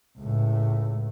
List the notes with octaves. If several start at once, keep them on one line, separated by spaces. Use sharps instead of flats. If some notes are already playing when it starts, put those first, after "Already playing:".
C#2 A2